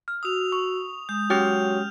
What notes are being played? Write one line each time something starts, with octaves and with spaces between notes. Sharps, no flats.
F6
F#4 D#6 E6 F7
C#6
G#3 D#6 G6
F#3 C#4 G4 G5 F6 G6 F7